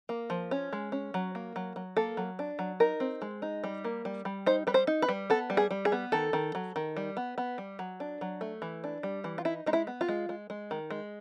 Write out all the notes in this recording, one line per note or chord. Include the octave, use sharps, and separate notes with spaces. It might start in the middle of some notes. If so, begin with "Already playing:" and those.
A#3
F3
C#4
G#3
C#4
F#3
A#3
F#3
F#3
A#3 A4
F#3
D4
F#3
D#4 A#4
C4
G#3
D#4
G3
A#3
G3
G3
D#4 C5
G3 B4
C5
D#4
B4
G3
B3 A4
G3
G#4
G3
G#4
B3
D#3 A4
D#3
F#3
D#3
G3
B3
B3
G3
F#3
D4
F#3
A3
E3
D4
G3
E3
F4
D#4 E4
G#3 D#4
E4
B3
F4
G#3
G#3
G#3
D#3
G#3